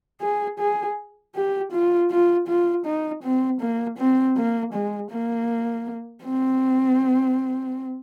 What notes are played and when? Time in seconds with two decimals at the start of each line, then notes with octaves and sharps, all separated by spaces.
0.21 G#4
0.59 G#4
1.35 G4
1.72 F4
2.10 F4
2.48 F4
2.85 D#4
3.23 C4
3.61 A#3
3.98 C4
4.37 A#3
4.73 G#3
5.11 A#3
6.25 C4